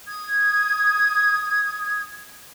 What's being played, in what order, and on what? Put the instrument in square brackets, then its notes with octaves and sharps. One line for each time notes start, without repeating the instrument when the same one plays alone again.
[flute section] D#6 G#6